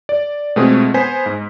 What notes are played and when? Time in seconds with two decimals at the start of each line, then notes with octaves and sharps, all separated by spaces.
0.09 D5
0.56 B2 G#3 A3 C4 F4 G#4
0.94 B3 C5 G#5 B6
1.26 G#2